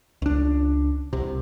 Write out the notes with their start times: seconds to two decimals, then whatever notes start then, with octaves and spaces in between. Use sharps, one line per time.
0.22 C#2 D4
1.13 C2 C3